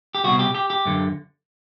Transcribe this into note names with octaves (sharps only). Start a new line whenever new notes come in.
G4
C2 B2 F#4
G4
G4
G4
F#2 D3